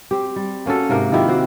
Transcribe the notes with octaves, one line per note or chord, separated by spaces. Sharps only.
C4 G4
G3
A#3 C#4 F#4 A4
G#2 C3 A#3 A#4
D#3 F3 E4 G4
C4 F#4 C5